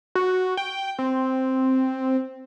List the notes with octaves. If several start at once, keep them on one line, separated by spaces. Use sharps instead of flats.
F#4
G5
C4